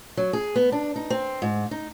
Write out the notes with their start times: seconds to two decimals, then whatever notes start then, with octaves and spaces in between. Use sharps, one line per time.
0.17 F#3
0.33 G#4
0.56 B3
0.72 D4
0.96 D#4
1.10 C4
1.42 G#2
1.71 D#4